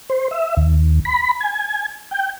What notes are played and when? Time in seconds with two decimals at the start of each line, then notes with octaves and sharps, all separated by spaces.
0.10 C5
0.31 E5
0.57 D#2
1.05 B5
1.40 G#5
2.11 G5